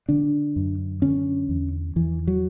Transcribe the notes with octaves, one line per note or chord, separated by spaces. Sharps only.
D3 D4
F#2
D3 C#4
E2
E2 E3
F#3